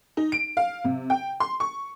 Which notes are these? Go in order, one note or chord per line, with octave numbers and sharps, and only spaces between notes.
D#4
D7
F5
C3
G5
C6
C#6